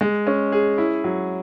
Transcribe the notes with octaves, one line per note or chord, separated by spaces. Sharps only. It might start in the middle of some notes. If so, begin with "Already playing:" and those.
G#3
C#4
G#4
E4
F#3